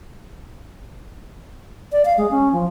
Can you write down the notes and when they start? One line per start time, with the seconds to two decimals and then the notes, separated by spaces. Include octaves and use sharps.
1.92 D5
2.05 F5
2.18 G#3
2.31 C#4
2.52 F3